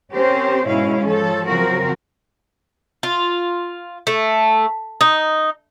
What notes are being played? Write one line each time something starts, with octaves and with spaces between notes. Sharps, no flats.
C4 C#4 G4 A#4 C5
G#2 B2 C#4 E4 F5
F3 A4 C#5
C#3 F3 F#3 C4 F#4 A#4
F4
A3
D#4